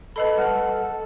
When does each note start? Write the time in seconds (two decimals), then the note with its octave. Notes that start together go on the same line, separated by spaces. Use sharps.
0.16 A4 B4 D#5 B5
0.38 G3 F#4 B4 A5